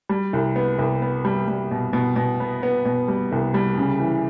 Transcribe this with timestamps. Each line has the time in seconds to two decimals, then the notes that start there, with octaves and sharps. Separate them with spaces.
0.09 G3
0.33 C2
0.56 B3
0.79 C2
1.02 B3
1.25 G3
1.48 G3
1.71 B2
1.93 B2
2.16 B2
2.40 B3
2.63 B3
2.85 B2
3.08 G3
3.32 C2
3.54 G3
3.78 C#3
4.00 E3